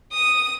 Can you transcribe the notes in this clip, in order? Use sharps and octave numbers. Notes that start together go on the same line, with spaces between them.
D#6